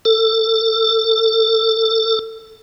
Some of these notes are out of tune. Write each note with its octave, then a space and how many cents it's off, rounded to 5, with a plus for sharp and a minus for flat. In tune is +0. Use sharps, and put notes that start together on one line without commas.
A4 +25